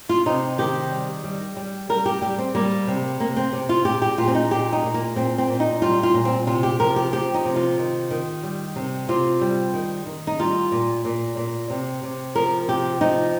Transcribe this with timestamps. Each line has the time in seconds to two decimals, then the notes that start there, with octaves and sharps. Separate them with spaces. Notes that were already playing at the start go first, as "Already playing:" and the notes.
0.09 F4
0.26 C3 D#4
0.58 D#3 G4
0.91 G3
1.24 G3
1.57 G3
1.89 G3 A#4
2.06 G4
2.22 G3 G4
2.38 C4
2.55 G3 A#3
2.87 C3
3.20 C3 A#3
3.37 C4
3.53 C3
3.69 F4
3.85 A#2 G4
4.02 G4
4.18 A#2 F4
4.28 C4
4.35 D#4
4.51 A#2 G4
4.73 D#4
4.83 A#2
4.94 A#3
5.16 A#2 C4
5.38 C4
5.48 A#2
5.60 D#4
5.82 G3 F4
6.03 F4
6.14 A#2
6.25 C4
6.47 C3 F4
6.63 G4
6.79 F3 A#4
6.96 G4
7.12 F3 G4
7.34 D#4
7.45 C3
7.56 F4
7.78 D#3
8.11 D#3
8.43 G3
8.76 C3
9.08 C3 F4
9.41 G3
9.74 D#3
10.06 D#3
10.27 D#4
10.39 G3 F4
10.72 A#2
11.05 A#2
11.37 A#2
11.70 C3
12.03 C3
12.35 F3 A#4
12.68 C3 G4
13.01 F3 D#4